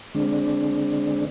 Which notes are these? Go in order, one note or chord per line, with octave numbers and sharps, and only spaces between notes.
D3 G#3 C4 D4